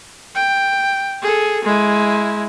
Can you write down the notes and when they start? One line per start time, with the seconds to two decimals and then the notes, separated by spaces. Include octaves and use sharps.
0.35 G5
1.22 G#4 A4
1.65 G#3 E4